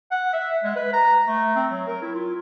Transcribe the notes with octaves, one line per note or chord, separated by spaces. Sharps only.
F#5
E5
G#3
B4
A#5
A3
C4
F#3
A#4
E4
F4